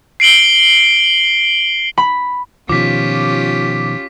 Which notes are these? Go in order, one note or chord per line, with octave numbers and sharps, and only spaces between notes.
C7 D7 F#7 G7
B5
B2 D#3 F3 C#4 F4 G4 D6 B6